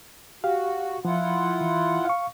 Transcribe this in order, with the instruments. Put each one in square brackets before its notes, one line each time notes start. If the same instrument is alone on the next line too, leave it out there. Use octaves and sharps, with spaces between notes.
[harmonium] F#4 [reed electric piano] G4 F5
[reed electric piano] F3 [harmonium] E4 F4 F#5
[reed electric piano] E3
F5 C#6